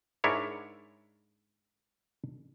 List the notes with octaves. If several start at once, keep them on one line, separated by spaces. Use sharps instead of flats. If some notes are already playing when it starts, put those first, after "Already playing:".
G#2 D4 E4 A#4 C#5